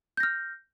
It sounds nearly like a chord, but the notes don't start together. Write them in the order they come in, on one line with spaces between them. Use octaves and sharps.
G6 A#6 F6